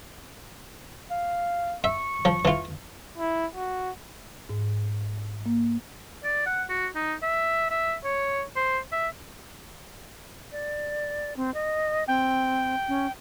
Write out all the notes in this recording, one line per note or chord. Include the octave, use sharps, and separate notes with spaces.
F5
E5 C#6
F3
E3 F4
E4
F#4
G#2
A#3
D5
F#5
F#4
D#4
E5
E5
C#5
C5
E5
D5
C4
D#5
C4 G5
C#4